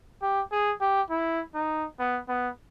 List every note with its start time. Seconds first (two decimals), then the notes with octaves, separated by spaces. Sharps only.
0.22 G4
0.52 G#4
0.81 G4
1.10 E4
1.55 D#4
1.99 B3
2.28 B3